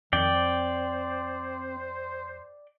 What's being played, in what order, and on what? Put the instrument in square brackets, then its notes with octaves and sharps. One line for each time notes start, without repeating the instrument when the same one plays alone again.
[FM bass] F2 [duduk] D#3 [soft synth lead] C4 [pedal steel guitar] D5 G5
[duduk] C5